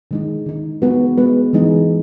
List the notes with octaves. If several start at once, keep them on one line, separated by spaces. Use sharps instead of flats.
D#3 G#3 D#4
D#3 G#3 D#4
G#3 B3 F#4 B4
G#3 B3 F#4 B4
E3 G#3 D#4